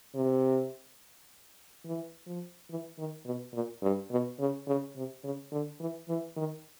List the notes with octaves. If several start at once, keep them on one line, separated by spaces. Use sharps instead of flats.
C3
E3
F3
E3
D#3
B2
A#2
G2
B2
C#3
C#3
C3
C#3
D3
E3
E3
D#3